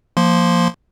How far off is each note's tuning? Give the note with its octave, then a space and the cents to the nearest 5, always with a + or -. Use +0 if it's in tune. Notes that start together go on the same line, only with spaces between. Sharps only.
F3 +0 A#3 +0 C6 +0